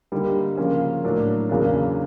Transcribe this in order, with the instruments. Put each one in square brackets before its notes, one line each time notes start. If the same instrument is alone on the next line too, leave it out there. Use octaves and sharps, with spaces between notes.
[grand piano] D3 G3 A#3 D#4
C#3 F3 A#3 C#4
A2 F#3 A#3 D4
E2 C#3 F#3 A#3 D4